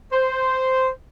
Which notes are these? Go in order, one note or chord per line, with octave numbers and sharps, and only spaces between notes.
C5